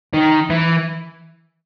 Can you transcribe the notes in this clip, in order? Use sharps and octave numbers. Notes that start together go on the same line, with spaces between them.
D#3
E3